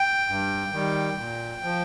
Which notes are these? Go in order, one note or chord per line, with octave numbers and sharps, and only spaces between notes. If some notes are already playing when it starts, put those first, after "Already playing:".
Already playing: G5
G2
D#3 G3
A#2
F3